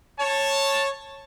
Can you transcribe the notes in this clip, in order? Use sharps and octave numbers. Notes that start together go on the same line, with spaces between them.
C#5 A5